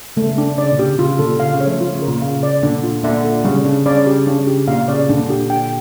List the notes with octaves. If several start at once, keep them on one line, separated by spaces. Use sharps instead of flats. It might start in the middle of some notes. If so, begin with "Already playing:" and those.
C#3 A3
D4
C#3 D5
A#2 D3
G4
C#3
C#3 F4
A#2 D3 A4
C#3 F5
C#3
C#5
F3 A3
F4
C#3
A#4
A#2
C#3 F5
D5
A#2 D3 D4
F4
A#2 D3 E5
A4
C#3 G3
C#3 D4
C#3 D5
G4
C#3 D4
G4
A#2 F5
C#3 D5
A#2 D3 D4
G4
G5